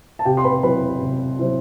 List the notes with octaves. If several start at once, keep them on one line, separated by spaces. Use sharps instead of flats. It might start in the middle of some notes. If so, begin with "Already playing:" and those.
A5
C3 G4 G5
C6
B4 B5
F#3 C4 E4 B4 B5
C3
F#3 C4 E4